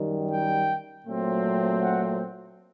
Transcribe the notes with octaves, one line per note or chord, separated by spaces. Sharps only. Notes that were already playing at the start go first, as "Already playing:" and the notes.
Already playing: F#2 D#3 G3
G5
A#2 F#3 A3 C4
F#5